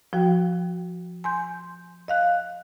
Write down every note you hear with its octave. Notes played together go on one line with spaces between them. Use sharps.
F3 F#4 G5
G#5 C6 G6
D#5 F5 F#6